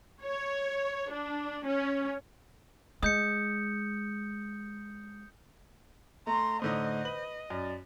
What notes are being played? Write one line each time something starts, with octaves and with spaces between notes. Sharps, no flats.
C#5
D4
C#4
G#3 D#6 G6 C#7
A3 A#5 C6
A2 D3 D#4 C5 D#5
B4 F#7
F#2 D5